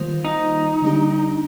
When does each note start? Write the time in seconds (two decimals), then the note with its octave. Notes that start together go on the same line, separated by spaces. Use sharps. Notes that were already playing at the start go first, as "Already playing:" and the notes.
Already playing: D#3 G3 A#3 F4 C5
0.25 D#4
0.82 D3 G3 A#3 D4 G4